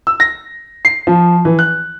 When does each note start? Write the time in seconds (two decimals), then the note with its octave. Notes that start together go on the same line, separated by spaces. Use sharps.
0.07 E6
0.20 A#6
0.85 C7
1.07 F3
1.45 E3
1.59 F#6